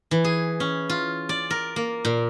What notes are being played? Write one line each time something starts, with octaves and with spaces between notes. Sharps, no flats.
E3
G#4
C#4
F4
D5
A#4
A#3
A#2